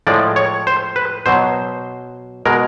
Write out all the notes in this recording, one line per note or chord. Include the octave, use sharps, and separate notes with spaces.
A2 F3 G#3 D5
C#5
C5
B4
B2 F#3 C5
B2 G#3 A#4